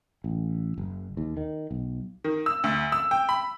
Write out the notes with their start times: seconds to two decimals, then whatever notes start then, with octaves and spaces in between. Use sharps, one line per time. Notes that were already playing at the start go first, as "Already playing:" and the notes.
0.24 A1
0.78 F#1
1.17 D#2
1.37 D#3
1.71 B1
2.24 D#3
2.46 E6
2.64 D2
2.92 E6
3.11 G5
3.29 B5